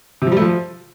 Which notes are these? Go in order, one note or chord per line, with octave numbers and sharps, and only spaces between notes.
C3
F3
G3
A3
F3